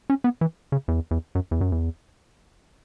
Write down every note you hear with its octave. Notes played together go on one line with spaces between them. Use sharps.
C#4
B3
E3
C#3
E2
E2
F#2
E2
F#2
E2